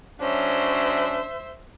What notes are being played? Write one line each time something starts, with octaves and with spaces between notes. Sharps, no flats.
F#3 C#4 D4 C5 E5